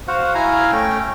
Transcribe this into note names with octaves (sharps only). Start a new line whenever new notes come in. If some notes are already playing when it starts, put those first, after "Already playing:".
F#4 C5 F5 F#5
E4 F5 G#5 A#5
A3 C#4 G5